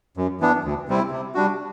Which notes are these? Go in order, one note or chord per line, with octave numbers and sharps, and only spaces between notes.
F#2
E3 B3 D4
D2
C3 G3 C4 E4
C3
G3 D4 F#4